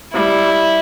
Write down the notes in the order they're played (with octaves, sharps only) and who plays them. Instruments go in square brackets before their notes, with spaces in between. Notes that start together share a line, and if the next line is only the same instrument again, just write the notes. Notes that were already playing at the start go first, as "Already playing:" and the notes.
[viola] G3 [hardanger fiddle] E4